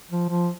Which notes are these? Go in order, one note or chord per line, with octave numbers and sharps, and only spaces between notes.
F3
F3